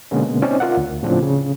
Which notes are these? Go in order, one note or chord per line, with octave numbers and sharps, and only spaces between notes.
B2 D3 G#3 A#3 B3 C#4
C4 C#4 D#4 C5 D5
F4 A#4 D5 E5 F#5
D2
A2 C#3 F3 C4 D4
C#3